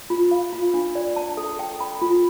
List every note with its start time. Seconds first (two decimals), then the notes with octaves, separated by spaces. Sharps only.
0.10 F4
0.31 F5
0.53 F4
0.74 D4
0.95 D5
1.16 A5
1.37 A4
1.59 G5
1.80 B5
2.02 F4